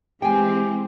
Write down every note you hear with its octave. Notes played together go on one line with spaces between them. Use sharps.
E3 G#3 C4 G4 G5 G#5